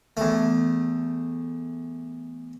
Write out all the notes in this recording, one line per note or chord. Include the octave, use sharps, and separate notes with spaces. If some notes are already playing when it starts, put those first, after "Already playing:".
E2 A3